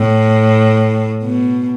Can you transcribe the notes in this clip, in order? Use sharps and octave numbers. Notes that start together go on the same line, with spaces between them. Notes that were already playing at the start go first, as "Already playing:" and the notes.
Already playing: A2
B2